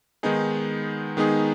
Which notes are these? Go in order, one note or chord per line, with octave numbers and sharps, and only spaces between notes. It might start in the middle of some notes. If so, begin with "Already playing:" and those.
D#3 G#3 B3 D#4 G#4
D#3 G#3 B3 D#4 G#4